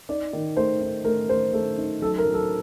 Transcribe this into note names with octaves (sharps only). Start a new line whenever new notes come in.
D#4 D5
D#3
A3 C5
D#4
A3 A#4
A3 C5
A3 A4
D#4
F#3 A4
A#4
F#3
A4